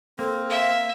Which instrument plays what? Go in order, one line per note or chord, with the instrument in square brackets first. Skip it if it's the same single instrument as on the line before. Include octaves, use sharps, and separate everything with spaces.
[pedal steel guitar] A#3 [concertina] C4 [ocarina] A4
[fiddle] E5 [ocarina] F5